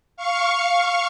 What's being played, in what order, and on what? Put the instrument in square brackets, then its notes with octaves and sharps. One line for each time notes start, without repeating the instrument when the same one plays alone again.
[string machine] F5 C#6